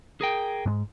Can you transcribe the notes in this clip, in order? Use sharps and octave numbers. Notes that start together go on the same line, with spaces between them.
G#4 A#4 G5
G#2 G#3